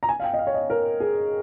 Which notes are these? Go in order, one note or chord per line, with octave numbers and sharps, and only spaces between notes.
A#5
G#5
F5
G5
D#5
F5
C#5
D#5
A#4
G#4